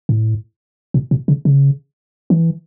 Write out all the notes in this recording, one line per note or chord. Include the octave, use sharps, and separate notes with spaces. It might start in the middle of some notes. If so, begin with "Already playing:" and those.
A2
B2
B2
C#3
C#3
E3